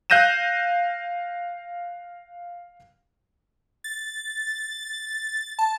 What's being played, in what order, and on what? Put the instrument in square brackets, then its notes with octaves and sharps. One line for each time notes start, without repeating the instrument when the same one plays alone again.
[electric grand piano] F5 F#6 G6 A#6 D#7 E7
[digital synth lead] A6
A5